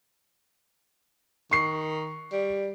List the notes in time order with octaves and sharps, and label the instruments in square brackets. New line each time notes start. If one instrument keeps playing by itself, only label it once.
[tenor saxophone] D#3 [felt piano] C#6 C7
[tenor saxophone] G3